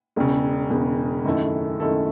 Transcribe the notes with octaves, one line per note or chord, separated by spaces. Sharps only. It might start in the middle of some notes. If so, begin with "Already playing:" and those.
E1 E2 C#3
E1 E2 C#3
F#2 D#3 A3 E4 A4
F#2 D#3 A3 E4 A4